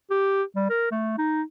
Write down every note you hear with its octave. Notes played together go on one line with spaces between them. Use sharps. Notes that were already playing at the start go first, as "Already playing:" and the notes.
G4
G3
A#4
A3
D#4